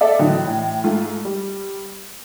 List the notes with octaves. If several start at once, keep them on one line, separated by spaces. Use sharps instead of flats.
A4 D5 E5
A2 D3 E3 F#3 D#4
A2 E3
G#2 A3 F4
G3